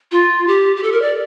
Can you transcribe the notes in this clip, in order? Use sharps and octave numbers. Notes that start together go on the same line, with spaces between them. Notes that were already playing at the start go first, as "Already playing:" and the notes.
F4
G4
G4
A4
A#4
D5